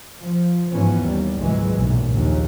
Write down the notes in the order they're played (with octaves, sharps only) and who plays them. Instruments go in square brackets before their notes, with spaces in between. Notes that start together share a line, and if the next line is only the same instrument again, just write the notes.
[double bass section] F3
G#2 E3 F3 B3 C#4
D#2 G3
G#1 C#2 A#2 E3 F#3 G#3
B1 F#2 A#2
A#1 D#2 C#3